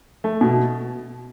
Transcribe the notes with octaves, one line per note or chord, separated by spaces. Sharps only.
A3
B2